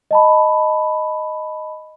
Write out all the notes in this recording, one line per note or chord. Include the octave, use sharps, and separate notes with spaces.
D#5 A5 B5